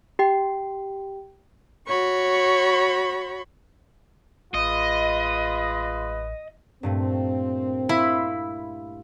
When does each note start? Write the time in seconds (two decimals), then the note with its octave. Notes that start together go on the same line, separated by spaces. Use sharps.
0.19 G4 G5
1.88 F#4 C#5 B5 C#6
4.54 A1 G#3 F4 B4 D#5
6.83 G2 A#2 A3 C4
7.89 E4 F5 B5 C6